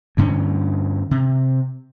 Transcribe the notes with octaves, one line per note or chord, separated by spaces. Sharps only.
D2 G2 D3 C#4
C3